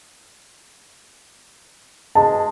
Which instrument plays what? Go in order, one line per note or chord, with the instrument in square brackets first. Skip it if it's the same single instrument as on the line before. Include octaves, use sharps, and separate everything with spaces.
[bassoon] G#3 [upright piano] A5